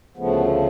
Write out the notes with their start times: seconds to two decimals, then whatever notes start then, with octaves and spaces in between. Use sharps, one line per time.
0.17 D2 C#3 F3 A3 B3